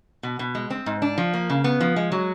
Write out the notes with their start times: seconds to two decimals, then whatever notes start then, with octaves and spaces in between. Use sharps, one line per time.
0.23 B2
0.39 B2
0.55 G#3
0.70 C4
0.86 G#2
1.02 D4
1.18 F3
1.34 A#3
1.50 C#3
1.64 B3
1.81 F3
1.96 G#3
2.12 F#3